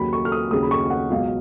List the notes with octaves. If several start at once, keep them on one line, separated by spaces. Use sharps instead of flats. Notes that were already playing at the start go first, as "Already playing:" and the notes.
Already playing: D#2 C#3 F#3 B5
C#6
F6
D#6
D#2 C#3 F#3 D#6
B5
C#6
F#5
C#2 B2 F#3 F5